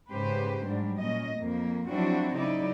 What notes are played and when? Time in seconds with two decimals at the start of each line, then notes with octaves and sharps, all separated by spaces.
0.12 G#2 C#3 G4 B4 C5
0.65 G#2 F#3 G3 D4
0.99 A#2 C#4 D#5
1.37 F2 A#3
1.89 F3 F#3 C4 D4 E4 F#4
2.35 C#3 F#3 D#4 E4 D5